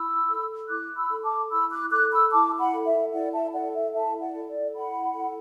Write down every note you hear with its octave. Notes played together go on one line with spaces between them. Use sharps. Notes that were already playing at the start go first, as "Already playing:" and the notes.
Already playing: E4 B5 E6
A4
E4 D6 F#6
B5 E6
A4
A5 D6
E4 B5 E6
D6 F#6
A4 D6 F#6
B5 E6
E4 A5 D6
F#5 B5
A4
E5
E4 D5 F#5
E5 A5
A4 D5 F#5
E5
E4 E5 A5
D5 F#5
A4
D5
E4 F#5 B5
A4